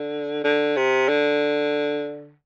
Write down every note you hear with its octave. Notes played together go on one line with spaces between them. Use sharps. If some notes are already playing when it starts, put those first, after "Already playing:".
Already playing: D3
D3
C3
D3